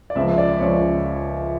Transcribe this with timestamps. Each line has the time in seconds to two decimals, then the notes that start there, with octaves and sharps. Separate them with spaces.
0.10 D5
0.15 C#2 C#3 F3 E5
0.38 D5
0.59 C#2 C#3 F3 C#5